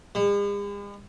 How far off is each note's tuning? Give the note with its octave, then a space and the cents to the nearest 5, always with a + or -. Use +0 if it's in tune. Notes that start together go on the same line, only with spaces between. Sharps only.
G#3 -45